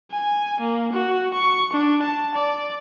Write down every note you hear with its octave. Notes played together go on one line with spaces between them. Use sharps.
G#5
A#3
F#4
C#6
D4
A5
D5